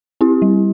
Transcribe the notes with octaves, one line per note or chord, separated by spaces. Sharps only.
C4 E4 G4
G3